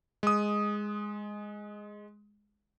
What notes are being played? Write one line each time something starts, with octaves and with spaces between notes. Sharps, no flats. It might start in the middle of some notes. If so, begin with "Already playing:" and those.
G#3 D#6